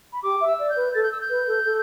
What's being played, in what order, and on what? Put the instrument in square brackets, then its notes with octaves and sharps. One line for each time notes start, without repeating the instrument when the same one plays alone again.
[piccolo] B5
[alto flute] G4 [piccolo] D6
[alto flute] E5
[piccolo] E6
[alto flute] D5
[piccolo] G6
[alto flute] B4
[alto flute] A4 [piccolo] A6
[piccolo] G6
E6
G6
[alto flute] B4
A4
A4